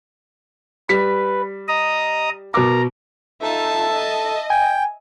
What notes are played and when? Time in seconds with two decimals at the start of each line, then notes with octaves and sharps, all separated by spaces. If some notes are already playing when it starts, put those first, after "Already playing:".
0.89 G3 B4 B6
1.68 D#5 A#5 D#6
2.54 B2 A#4 A#5 D6
3.42 D#4 F4 A4 E5 A5
3.93 D#5
4.50 G5 G#5